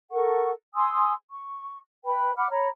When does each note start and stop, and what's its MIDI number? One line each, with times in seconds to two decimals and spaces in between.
0.11 0.51 69
0.11 0.51 70
0.11 0.51 78
0.11 0.51 85
0.74 1.12 80
0.74 1.12 84
0.74 1.12 87
0.74 1.12 88
1.31 1.78 85
2.04 2.31 71
2.04 2.31 79
2.04 2.31 83
2.36 2.49 78
2.36 2.49 83
2.36 2.49 86
2.36 2.49 89
2.51 2.68 73
2.51 2.68 82
2.51 2.68 83